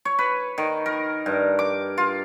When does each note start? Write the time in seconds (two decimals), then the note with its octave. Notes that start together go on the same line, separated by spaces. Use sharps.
0.05 C#5
0.19 B4
0.58 D#3
0.86 A#4
1.26 G2
1.59 D6
1.98 F4